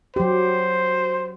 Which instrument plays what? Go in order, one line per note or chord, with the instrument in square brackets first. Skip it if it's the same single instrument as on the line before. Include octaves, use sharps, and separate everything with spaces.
[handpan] F#3 G4 [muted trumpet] C5